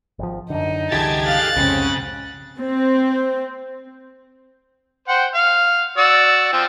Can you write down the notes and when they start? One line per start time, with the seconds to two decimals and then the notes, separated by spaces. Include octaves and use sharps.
0.19 G#1 F3
0.50 F#2 D3 D#4
0.92 C2 D3 E3 G4 G#4 A5 G#6 A6
1.25 A4 F5 F#6 A6
1.56 C2 F2 G#2 C#3 C4 C#4
2.58 C4
5.08 C5 F#5 G5
5.35 F5
5.97 F#4 D5 E6
6.53 F3 C4